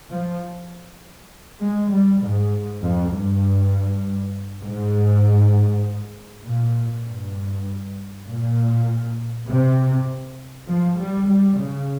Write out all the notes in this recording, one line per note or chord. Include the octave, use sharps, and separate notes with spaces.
F3
G#3
G3
G#2
F2
G2
G#2
A#2
G2
A#2
C3
F3
G3
G3
C#3